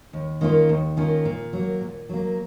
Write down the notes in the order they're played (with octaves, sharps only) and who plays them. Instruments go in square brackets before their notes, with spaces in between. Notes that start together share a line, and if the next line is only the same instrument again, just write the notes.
[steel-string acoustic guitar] D#2
D#3 A#3 C#4 F4
D#2
D#3 A#3 C#4 F4
A#2
F#3 A#3
A#2
F#3 A#3